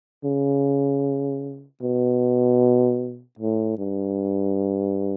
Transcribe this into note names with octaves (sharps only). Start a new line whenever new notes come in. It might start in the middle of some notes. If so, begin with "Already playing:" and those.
C#3
B2
A2
G2